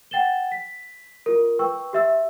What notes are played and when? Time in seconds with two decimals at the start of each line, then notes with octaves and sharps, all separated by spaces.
0.11 F#5 G5 A6 E7 G7
0.52 B6
1.26 F4 A#4
1.59 B4 G5 C#6 E6
1.93 G4 E5 E6